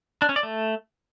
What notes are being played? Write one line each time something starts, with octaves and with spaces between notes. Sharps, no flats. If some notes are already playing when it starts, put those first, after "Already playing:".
D4
C#4
D5
A3